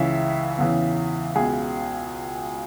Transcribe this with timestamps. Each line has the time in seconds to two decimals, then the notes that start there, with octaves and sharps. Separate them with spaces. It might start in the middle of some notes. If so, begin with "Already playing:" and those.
Already playing: C#2 C#3 E3 E5
0.58 E2 C#3 E3
1.35 C#2 B2 G#4